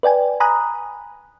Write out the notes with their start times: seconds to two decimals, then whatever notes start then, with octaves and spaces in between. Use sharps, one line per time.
0.03 B4 D5 G5 G#5
0.40 G#5 A#5 B5 D#6 F#6